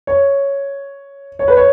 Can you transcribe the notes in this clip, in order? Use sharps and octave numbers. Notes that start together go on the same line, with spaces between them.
C#5
C#5
B4
C#5